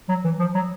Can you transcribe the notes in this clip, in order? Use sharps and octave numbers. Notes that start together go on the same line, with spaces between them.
F#3
E3
F3
F#3